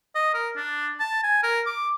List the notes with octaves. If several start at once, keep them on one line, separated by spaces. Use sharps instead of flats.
D#5
A#4
D4
A5
G#5
A#4
D6